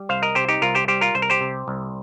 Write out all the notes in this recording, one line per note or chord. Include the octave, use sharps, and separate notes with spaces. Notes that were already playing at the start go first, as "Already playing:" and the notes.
Already playing: G3
C2 C5 F5
A#4 D#5
C3 G4 C5
D#4 G4
C2 F4 A#4
G4 C5
G3 G4 C5
F4 A#4
C2 C5
A#4
G4 C5
C3
C2